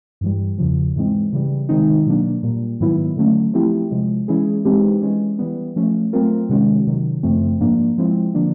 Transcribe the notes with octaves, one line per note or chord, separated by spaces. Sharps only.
G2 E3 G3
E2 C#3 F3
G#2 E3 G#3 C4
C#3 E3 G3
C3 D#3 G#3 C4 D#4
B2 F#3 A#3 D4
A#2 G3 A#3
G#2 D#3 F#3 B3 E4
D3 F#3 A3 C#4
F3 A3 C4 E4 G4
C3 F3 G#3
E3 G#3 C#4 E4 G#4
E3 G#3 C4 D#4 G4
E3 G#3 C#4
E3 G3 B3
F3 A3 C#4
F#3 A3 C4 F4 A#4
C3 D#3 G#3 C#4 F#4
C3 D#3 F#3
F#2 C#3 F3 A3 C4
G#2 F3 A#3 D4
F3 G#3 C4 E4
D3 F3 A#3 D4